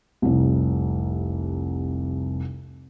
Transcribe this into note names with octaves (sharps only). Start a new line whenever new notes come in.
F1 C2